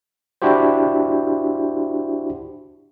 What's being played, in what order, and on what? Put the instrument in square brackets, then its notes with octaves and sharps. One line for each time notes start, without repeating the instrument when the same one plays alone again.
[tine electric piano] D4 E4 F#4 G4 C5